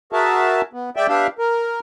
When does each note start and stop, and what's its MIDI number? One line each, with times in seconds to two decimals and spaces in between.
0.13 0.61 66
0.13 0.61 68
0.13 0.61 70
0.13 0.61 76
0.13 0.61 81
0.73 0.90 59
0.96 1.07 56
0.96 1.07 74
0.96 1.07 76
0.96 1.07 79
1.09 1.27 59
1.09 1.27 62
1.09 1.27 67
1.09 1.27 76
1.09 1.27 77
1.39 1.80 70